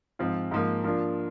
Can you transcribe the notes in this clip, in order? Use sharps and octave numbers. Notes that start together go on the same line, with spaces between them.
G#2 F3 C4 F4
G#2 F3 A#3
F3 A#3 D4 F4